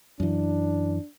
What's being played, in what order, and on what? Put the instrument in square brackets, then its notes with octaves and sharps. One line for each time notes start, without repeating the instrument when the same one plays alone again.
[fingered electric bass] F#2 E3 [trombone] D4